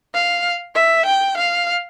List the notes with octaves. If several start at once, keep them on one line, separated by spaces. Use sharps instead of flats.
F5
E5
G5
F5